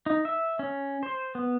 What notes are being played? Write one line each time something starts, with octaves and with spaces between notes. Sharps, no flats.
D#4
E5
C#4
C5
B3